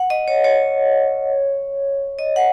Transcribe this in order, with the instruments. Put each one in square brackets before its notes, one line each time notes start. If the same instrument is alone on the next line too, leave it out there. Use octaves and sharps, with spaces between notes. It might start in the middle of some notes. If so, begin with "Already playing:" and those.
Already playing: [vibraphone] F#5
D#5
C#5
C#5
D#5
F#5